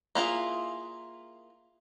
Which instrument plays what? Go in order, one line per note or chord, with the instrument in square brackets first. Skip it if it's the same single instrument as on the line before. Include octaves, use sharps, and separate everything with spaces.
[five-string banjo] A#3 E4 F4 G#4